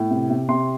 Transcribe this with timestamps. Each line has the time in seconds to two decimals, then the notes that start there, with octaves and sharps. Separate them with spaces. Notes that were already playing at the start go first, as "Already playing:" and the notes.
Already playing: A2
0.11 C3
0.30 C3
0.49 C3 C6